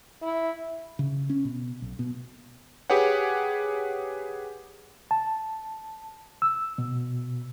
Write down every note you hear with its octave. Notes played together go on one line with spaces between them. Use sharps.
E4
C#3
C#4
B2
B1
B2
G4 G#4 B4 C#5 F#5
A5
E6
B2